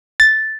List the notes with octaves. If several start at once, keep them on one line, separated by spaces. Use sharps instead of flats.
A6